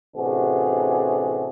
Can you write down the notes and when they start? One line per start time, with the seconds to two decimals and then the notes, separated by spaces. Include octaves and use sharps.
0.16 A1 C3 D4 F#4 G#4